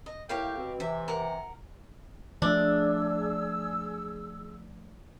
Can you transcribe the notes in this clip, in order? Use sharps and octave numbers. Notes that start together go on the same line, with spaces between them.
D#5
A2 A#3 G4 C#5 F5 G5
B2 C4
C3 E3 E5
A#4 F#5
F3 A3 D4 G#4 E6